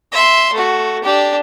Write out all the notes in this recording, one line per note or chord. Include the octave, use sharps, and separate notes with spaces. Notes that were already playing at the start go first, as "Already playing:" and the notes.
E5 C6
A3 F#4
D4 G4